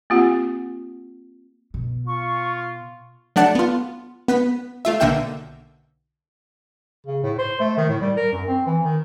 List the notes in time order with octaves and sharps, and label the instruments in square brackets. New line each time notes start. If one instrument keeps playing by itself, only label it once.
[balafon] A#3 C4 F4 G4 F#5
[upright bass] B2
[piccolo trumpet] F4 [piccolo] C#6
[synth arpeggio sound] F#3 A3 D4 D5 F#5 A5
B3 F4
B3 B4 B6
A3 F4 E5
B1 D3 A#3 E5 G5 G6
[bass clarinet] C#3
A2
C5
A3
D#3
A2
G3
A#4
F#2
C4
E3
D#3